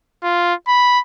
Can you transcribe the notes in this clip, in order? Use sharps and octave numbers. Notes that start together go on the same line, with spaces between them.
F4
B5